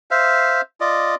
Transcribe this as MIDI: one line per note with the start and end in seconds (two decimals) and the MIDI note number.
0.11 0.61 72
0.11 0.61 76
0.11 0.61 77
0.81 1.15 65
0.81 1.15 74
0.81 1.15 75